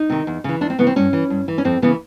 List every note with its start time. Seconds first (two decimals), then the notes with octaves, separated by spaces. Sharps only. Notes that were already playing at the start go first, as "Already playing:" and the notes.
Already playing: D#4
0.10 C3 D#3
0.27 E2
0.44 C#3 E3
0.61 E2 D4
0.70 C4
0.78 C#3 E3 B3
0.87 C4
0.96 G2 C#4
1.13 E3
1.30 G2
1.48 E3
1.58 C#4
1.65 F2 C4
1.82 C#3 E3 B3